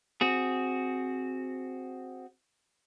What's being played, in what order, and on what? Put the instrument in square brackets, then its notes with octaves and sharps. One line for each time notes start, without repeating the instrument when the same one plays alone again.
[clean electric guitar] C4 F#4 G#4